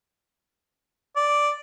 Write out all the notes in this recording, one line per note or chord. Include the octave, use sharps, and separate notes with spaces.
D5